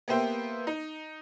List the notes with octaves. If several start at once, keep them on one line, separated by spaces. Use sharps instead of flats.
A#3 B3 G4 C5 E5 G5
D#4